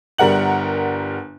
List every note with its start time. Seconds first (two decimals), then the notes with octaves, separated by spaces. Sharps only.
0.18 G1 G3 A#4 F#5 F#7